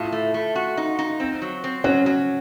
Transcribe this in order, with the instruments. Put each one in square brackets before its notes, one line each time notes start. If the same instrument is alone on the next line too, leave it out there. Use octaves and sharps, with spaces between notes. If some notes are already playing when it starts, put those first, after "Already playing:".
Already playing: [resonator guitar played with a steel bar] A2 [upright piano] F4
[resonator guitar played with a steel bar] A3
A3
F#4
D#4
D#4
C4
F#3
C4
[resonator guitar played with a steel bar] F#3 [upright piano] C#4
[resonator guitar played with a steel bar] F#3